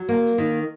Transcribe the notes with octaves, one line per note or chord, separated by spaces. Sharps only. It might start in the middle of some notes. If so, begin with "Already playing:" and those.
Already playing: F#3
A#3
D#3